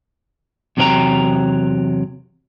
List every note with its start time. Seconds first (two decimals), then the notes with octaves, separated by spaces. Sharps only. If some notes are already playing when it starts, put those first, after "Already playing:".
0.77 E2 C3 F#3 D4 G5 A#5